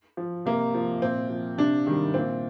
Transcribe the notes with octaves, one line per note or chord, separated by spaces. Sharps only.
F3
C3 A#3
F3
A#2 C4
F3
C3 D4
D#3 G3
A#2 C4